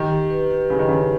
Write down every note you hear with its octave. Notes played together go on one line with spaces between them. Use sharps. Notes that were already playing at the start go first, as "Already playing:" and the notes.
Already playing: D#3 G4
G4
B4
G4
C#3 E4
D#3
C#3 B4